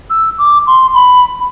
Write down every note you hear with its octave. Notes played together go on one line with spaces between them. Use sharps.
E6
D6
C6
B5